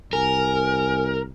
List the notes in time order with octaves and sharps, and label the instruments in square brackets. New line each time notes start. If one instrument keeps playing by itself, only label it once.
[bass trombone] C2 [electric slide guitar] A#4 [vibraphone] G#5